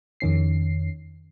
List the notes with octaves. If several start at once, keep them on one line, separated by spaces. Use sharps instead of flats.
F2 D#3 C#4 C7